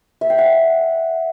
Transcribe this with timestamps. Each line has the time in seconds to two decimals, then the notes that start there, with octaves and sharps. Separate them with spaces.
0.21 E5
0.30 G5
0.38 F#5